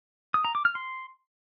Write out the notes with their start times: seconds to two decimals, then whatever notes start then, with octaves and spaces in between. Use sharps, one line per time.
0.34 D#6
0.45 A#5
0.55 D6
0.65 F6
0.75 C6